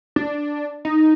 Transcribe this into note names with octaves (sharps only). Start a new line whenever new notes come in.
D4
D#4